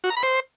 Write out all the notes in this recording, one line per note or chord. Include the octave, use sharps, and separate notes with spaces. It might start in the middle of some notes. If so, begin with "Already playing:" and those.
F#4
A#5
B5
C5